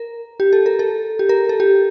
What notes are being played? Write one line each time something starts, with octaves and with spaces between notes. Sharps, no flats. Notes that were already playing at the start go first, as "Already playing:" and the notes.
Already playing: A#4
G4
A4
A#4
A4
G4
A#4
A4
G4